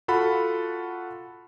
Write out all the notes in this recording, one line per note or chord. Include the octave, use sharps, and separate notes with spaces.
F4 F#4 A4 F#5 B5